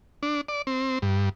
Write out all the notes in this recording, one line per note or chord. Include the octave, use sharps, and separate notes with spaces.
D4
D5
C4
G2